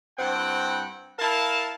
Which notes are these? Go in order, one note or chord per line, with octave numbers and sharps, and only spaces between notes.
G2 C4 E4 F#5 G5
E4 A#4 F5 A5